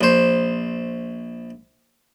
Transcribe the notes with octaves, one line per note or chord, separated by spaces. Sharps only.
A#1 C5